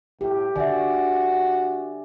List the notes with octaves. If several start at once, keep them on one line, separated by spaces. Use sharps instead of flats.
A2 G4
D3 F#4 D5 E5 G#5